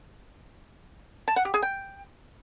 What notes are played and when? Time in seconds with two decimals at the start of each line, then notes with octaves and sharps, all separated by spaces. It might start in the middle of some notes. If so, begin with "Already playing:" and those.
1.28 A5
1.36 F#5
1.45 G4
1.54 G#4
1.62 G5